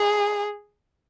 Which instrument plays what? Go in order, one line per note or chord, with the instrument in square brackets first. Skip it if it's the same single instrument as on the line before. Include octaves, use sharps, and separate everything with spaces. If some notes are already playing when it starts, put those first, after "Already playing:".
Already playing: [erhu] G#4